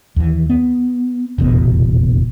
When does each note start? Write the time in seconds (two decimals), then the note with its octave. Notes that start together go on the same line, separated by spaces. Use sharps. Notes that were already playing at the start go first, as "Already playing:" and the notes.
0.16 D#2 E3
0.50 B3
1.38 F1 A#1 E2 B2